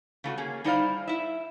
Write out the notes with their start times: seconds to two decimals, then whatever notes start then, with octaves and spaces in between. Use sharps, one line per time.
0.24 C#3 A3 E4 F#4
0.38 A#3 C#4 G#4
0.64 G3 D#4 E4 C5 D5 F5
1.08 E4 E5